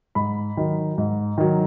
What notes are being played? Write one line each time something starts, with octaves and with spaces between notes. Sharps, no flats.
G#2 B5
D#3 F#3
G#2
D#3 F#3